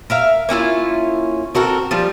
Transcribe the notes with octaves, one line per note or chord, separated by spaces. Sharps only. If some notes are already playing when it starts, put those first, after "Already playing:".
A#4 E5 F5
A#3 C#4 E4 F4
C4 F#4 A4 A#4
F3 G3 F4